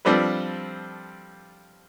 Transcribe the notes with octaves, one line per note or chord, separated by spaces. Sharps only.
F3 G3 C4 D4 A4 B4